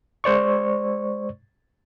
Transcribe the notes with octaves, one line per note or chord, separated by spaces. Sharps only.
G#3 C5 D5 C#6